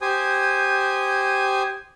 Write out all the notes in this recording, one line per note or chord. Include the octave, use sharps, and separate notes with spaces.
G4 C5 G#5 D#6